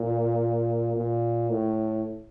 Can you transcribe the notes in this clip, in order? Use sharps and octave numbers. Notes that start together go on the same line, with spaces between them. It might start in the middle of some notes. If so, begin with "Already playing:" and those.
Already playing: A#2
A#2
A2